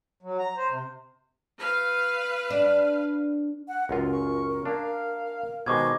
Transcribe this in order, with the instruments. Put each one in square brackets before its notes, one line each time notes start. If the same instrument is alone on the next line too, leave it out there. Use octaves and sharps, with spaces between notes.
[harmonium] F#3
A#5
C5
C3
[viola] B4 F5
[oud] D4
[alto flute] F#5
[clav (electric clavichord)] C#2 F#2 F4 [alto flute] A#4
[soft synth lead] C#6
[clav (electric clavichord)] A#3 D4 [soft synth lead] F5
[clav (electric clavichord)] B2 D#3 G#3 [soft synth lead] C5 [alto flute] D#5 [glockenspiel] C#6 D6 G#6